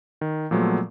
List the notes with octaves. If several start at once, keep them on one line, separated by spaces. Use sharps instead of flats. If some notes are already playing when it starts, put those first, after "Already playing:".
D#3
A#2 F3 F#3 G#3 A3 B3